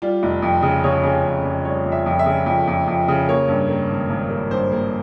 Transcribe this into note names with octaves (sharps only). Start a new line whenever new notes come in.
G3 F4
F1
F2
C#3
C#3 C#5
C#3
F2
F2
G3 C#5
F2
E5
F2
E5
C#3
F2
F2
F2
C#3
A#3 C#5
G2
A#3
G#1
G#1
A#3
G2 C5
A#3